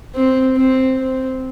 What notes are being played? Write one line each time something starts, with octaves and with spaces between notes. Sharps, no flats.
C4
C4
C4